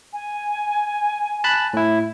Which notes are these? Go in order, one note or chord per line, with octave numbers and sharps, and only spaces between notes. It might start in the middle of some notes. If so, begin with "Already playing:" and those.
G#5
A5 B5 F#6
A2 E4